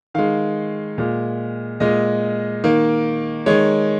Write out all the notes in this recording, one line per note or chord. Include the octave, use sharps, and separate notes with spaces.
D#3 G#3 F5
A#2 G#3
A#2 G#3 D#5
D#3 A#3
D#3 G#3 C#5